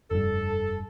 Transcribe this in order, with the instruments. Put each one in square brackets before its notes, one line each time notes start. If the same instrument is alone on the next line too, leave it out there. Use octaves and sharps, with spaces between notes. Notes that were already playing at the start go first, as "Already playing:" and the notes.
[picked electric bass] F1 G2 [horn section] A4